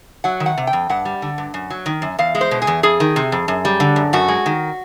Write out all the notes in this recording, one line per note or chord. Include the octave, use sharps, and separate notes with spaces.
F#3 F#5
D#3
F#5
C3
G5
F2
G2 F#5
G3
D3
G2
F#2
F#3
D#3
F#2
E2 F5
G#3
C5
B2
G#4
E2
F2 G#4
D#3
C3
F2
F#2
G3
D3
F#2
F#2 F#4
G#3
D#3